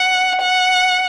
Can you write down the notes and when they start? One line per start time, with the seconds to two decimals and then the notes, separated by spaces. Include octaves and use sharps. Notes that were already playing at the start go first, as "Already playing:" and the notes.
Already playing: F#5
0.41 F#5